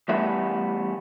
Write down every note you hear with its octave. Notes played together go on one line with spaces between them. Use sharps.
E3 G3 A3 B3 E5